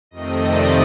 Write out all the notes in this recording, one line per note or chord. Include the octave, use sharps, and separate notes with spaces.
F2 C3 D#3 A3 C4 D#5
D5